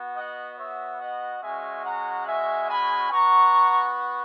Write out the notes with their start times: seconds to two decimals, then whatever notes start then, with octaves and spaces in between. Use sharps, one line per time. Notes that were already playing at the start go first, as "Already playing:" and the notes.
Already playing: B3 F#4
0.14 D#5 F#5
0.56 C#5 E5
0.99 D#5 F#5
1.41 G#3 C#4 F#4 E5 G#5
1.84 F#5 A#5
2.27 E5 G#5
2.69 G#5 B5
3.11 B3 F#4 A#5 C#6